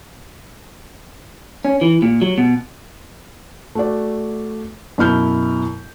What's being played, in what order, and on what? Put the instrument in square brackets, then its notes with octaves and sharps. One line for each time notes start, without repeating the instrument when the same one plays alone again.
[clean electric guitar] C#4
E3
A#2
F#3
B2
[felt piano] A3 F#4 D5
F#2 B2 E4 F6 G6